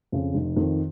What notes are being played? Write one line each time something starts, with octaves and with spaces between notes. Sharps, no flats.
F2 C#3
F1
F2 D#3